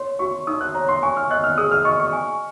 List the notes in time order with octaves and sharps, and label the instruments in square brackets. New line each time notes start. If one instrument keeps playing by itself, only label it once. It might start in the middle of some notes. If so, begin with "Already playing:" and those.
Already playing: [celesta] C#5 [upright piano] C6
[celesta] F#4 [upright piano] C#6
[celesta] D#4 [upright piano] D#6
[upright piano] F#6
[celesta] C#5 [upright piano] A#5
[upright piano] C6
[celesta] G#5 [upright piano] C#6
[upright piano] F6
[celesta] D#5 [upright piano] F#6
[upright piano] F6
[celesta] G#4 [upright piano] D#6
[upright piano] F6
[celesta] D#5 [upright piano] C#6
[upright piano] C#6
[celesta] G#5